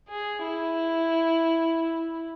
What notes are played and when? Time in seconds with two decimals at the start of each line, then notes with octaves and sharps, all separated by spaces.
0.09 G#4
0.44 E4